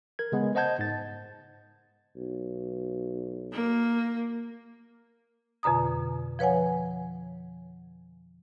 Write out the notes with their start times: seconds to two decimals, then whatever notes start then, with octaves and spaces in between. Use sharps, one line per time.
0.19 A#4 G#6
0.32 C#3 G#3 B3
0.55 C5 D#5 F#5 A5 G6 G#6
0.79 G#2 A6
2.16 B1
3.52 A#3
5.63 F2 B2 D3 A#5 D#6
6.39 F3 B4 C#5 F#5 G#5